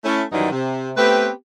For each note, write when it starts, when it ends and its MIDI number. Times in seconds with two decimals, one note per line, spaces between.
0.04 0.22 57
0.04 0.22 61
0.04 0.22 64
0.32 0.51 42
0.32 0.51 51
0.32 0.51 52
0.32 0.51 54
0.32 0.51 55
0.32 0.51 63
0.51 0.91 48
0.97 1.29 57
0.97 1.29 59
0.97 1.29 60
0.97 1.29 67
0.97 1.29 71